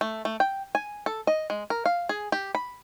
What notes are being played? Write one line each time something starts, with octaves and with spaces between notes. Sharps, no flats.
A3
A3
G5
G#5
A4
D#5
G#3
A#4
F5
G#4
G4
B5